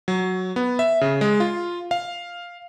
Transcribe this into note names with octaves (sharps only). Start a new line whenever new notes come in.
F#3
B3
E5
C#3
G#3
F4
F5